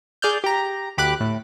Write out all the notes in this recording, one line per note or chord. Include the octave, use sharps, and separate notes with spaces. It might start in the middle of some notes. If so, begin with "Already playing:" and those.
G#4 D5 F6 G6
G4 A#5
D2 G4 B5 D6 F#6
A2